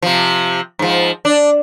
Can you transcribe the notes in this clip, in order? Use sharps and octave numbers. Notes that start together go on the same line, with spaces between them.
C3 F3
G#2 F3
D4